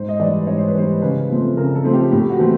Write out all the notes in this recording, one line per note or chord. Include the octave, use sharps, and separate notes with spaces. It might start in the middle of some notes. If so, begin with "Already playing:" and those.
Already playing: G#2 C5
D#5
E3 G3 D5
G#2 C#5
C5
B4
E3 G3 C5
C#3 B4
F3 A3 C4
C#3 A#4
A4
F3 A3 C4
G4
A2 G4
F#4
E3 A3 C4